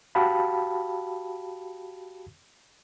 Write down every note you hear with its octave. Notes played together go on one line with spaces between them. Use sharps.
F#4 G4 F5 G5 A5 B5